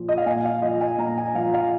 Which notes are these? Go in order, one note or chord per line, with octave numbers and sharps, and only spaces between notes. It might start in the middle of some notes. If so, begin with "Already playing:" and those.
Already playing: A#2 F3
D#5
F5
A#2 G#5
F5
F3 D#5
G#5
A#2 A#5
G#5
F3 F5
F5